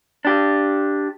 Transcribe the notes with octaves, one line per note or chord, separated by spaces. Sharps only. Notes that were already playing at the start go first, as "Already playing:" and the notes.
D4 G4